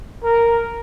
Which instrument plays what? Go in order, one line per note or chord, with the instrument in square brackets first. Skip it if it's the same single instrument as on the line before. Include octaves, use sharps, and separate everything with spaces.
[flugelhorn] A#4